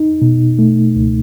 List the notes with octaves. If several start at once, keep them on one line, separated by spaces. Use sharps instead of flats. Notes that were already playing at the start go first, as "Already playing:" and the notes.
Already playing: D#4
B2
A3
C#2